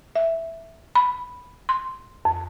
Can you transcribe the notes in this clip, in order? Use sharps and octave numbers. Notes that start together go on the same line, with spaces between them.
E5
B5
C6
F2